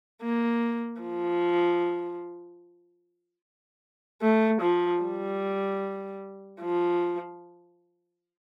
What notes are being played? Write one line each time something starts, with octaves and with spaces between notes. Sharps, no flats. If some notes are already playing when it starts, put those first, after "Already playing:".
A#3
F3
A3
F3
G3
F3